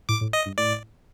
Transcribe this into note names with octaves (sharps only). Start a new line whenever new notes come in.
A2 D6
A2
D#5
G2
A2 D5